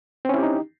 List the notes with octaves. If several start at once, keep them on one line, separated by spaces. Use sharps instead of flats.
C4 C#4 D#4 E4 G4